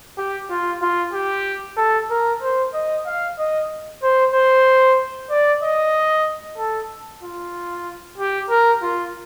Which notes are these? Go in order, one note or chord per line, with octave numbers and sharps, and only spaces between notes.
G4
F4
F4
G4
A4
A#4
C5
D#5
F5
D#5
C5
C5
D5
D#5
A4
F4
G4
A#4
F4